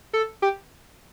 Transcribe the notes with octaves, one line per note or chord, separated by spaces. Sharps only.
A4
G4